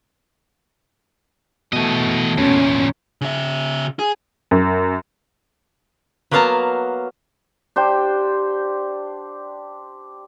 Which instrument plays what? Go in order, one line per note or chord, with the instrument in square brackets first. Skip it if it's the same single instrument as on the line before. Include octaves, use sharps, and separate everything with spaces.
[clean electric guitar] B2 A3 [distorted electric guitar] E3 D#5
[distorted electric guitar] E2 A#2 [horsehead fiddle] C#4
[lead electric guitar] C#3 E5
G#4
[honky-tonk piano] F#2
[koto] F#3 A#3 B3 F5 A5 A#5
[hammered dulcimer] D4 G4 C5 G5